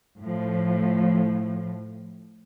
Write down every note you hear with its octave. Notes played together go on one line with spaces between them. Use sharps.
A2 F3